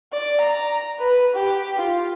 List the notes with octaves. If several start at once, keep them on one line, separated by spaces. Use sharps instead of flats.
D5
A#5
B4
G4
F4